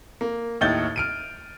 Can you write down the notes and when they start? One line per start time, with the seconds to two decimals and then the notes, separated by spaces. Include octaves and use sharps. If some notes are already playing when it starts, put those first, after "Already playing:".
0.21 A#3
0.61 D#2 A2 D#4 G6 A6 G7
0.96 F6 D7 D#7